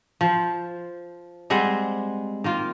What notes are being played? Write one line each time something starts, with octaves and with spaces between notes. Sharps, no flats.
F3 C5
G3 G#3 C4 F#5
D#3 A#3 F4